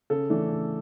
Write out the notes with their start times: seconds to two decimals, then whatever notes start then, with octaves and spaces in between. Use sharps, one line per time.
0.10 C#3 A4
0.30 E3 A3 D4
0.50 C#3